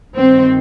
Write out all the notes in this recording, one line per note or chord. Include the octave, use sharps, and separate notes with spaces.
G2 D#3 C4